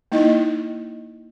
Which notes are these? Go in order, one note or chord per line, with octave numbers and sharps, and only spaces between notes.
A#3 D#4 E4 D#5